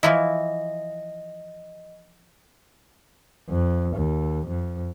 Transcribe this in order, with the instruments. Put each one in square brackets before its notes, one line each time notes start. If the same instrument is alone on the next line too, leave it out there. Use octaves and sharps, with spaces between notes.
[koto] E3 F3 E4 [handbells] D#5
[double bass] F2
D#2
F2